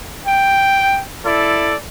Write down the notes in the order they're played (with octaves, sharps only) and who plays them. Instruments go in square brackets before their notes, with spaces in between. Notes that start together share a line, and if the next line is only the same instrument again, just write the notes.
[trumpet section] G5
E4 A4 D5